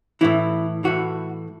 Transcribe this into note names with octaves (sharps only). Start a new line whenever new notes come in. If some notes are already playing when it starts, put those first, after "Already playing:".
A2 E3 E4
A2 E3 F#4